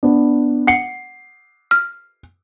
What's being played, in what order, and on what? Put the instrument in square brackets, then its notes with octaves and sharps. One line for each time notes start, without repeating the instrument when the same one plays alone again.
[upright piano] B3 D4
[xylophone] F#5 C#7 [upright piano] C7
[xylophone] F6